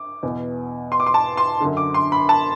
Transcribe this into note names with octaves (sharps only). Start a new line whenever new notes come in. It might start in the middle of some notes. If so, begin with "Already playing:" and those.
Already playing: D6
E2 B2
C6
D6
C6
A5
C6
F#2 D3
D6
C6
B5
A5